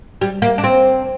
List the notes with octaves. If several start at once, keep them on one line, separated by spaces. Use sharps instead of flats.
G3
A#3
D4
C4